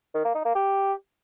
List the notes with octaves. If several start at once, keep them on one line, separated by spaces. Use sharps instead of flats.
D#3
A#3
D#4
A#3
G4